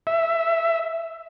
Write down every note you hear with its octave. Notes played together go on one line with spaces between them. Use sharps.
E5